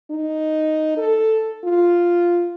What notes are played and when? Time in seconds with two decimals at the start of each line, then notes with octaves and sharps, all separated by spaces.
0.11 D#4
0.97 A4
1.64 F4